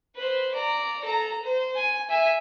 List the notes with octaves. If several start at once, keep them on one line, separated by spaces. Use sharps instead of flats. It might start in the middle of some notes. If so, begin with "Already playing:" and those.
B4 C5
D5 A#5
A4 A#5
C5
G#5
E5 G#5